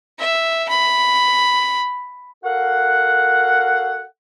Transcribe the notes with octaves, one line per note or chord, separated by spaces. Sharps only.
E5
B5
F#4 A4 A#4 F5 F#5